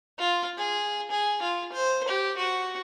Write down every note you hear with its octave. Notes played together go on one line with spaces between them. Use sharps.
F4
G#4
G#4
F4
C5
G4
F#4